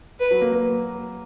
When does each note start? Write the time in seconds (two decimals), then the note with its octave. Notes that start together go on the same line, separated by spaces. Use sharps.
0.20 B4
0.31 F#3
0.41 A#3
0.52 A#3